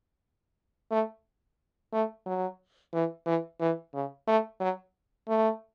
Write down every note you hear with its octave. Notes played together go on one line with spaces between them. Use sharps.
A3
A3
F#3
E3
E3
E3
C#3
A3
F#3
A3